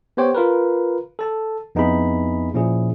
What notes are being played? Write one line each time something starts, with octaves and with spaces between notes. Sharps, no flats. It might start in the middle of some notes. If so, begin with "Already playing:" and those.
B3 G4 C5 C#5 G5
F4 A#4 B4
A4 A5
F2 B3 D#4 E4 G#4 B5
A#2 F3 C#4 E4 G#4